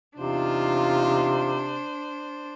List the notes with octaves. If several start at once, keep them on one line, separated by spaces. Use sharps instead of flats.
E2 C3 D4 D#4 F4 C5